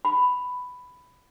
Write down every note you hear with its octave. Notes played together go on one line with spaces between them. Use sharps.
B5